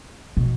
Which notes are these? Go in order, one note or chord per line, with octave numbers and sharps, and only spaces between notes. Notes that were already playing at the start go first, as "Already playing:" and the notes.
B2